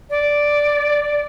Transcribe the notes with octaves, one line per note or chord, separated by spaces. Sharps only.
D5